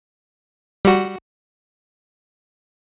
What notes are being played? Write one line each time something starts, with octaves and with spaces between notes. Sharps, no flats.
G3 F#4